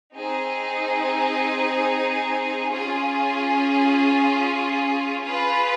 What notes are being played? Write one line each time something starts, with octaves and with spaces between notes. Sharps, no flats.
C4 D#4 G#4
C#4 F4 G#4
F4 G#4 B4